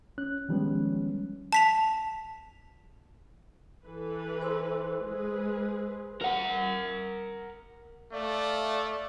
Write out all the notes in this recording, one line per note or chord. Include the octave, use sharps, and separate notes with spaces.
C#4 F#6
D#3 F3 G3 G#3 B3 C#4
A5 B6 F7
E3 A4 B4
C5 C6 E6
G#3 G#4 B4
A#4 F#5
A3 D5 E5 F5